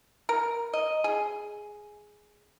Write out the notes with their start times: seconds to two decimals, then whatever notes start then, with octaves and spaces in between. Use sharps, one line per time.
0.29 A#4
0.73 D#5
1.04 G#4